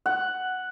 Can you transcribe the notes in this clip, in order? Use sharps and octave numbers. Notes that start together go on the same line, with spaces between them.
F#5